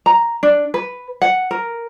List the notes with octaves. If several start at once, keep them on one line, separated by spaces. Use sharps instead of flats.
A#5
D4
B4
F#5
A#4